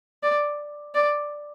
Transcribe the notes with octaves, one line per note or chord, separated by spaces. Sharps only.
D5
D5